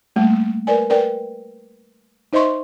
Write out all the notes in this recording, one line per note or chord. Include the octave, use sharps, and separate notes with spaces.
G3 A3 A#3
A#4 B4 D5 G#5
A#4 B4 D5 G5
D#4 C5 D#5 E5 C6 C#6